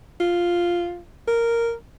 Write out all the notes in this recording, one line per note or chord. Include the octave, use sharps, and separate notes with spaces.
F4
A#4